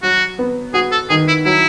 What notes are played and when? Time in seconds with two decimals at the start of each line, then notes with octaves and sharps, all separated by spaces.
0.03 F#3 F#4
0.39 B3
0.74 F#4 G#4
0.92 A4
1.10 D#3 G#4
1.28 E4
1.45 F#3 E4